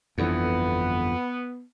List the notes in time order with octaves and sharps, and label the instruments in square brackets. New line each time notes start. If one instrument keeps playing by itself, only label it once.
[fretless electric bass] G1 D3 E3 [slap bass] F2 [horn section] B3